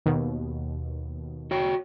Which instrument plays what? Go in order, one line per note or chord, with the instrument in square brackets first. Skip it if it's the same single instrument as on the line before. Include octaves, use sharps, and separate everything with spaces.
[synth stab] D#2 B2
[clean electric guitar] F#4 C#5 G5